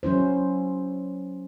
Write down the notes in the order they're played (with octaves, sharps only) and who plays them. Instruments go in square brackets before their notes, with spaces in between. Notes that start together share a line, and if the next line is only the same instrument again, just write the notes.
[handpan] F#3 C#4 E4 C5